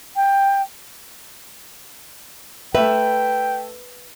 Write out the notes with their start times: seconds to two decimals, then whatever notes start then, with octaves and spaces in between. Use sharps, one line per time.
0.16 G5
2.75 A3 B4 E5 G5